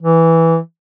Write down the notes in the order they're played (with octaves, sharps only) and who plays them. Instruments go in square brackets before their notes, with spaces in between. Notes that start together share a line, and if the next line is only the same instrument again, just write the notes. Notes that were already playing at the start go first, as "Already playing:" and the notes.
[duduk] E3